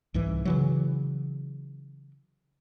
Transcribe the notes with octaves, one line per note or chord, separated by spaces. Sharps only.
C2 G#2 E3
C#3 E3 F#3